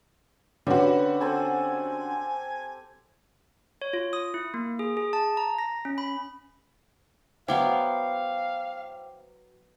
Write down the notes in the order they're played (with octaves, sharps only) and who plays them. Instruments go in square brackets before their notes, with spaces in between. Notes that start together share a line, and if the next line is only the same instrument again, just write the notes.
[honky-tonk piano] D3 F#4 [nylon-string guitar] C#4 [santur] G4 [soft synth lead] B4
[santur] C4 A4 C5 [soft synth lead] G#5
[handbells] C#5
F4
D#6
E4
A#3
G#4
G#4
A5
A#5
A#6
C#4
B5
[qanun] F#3 B3 E4 [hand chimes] C5 G5 D6 [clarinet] F5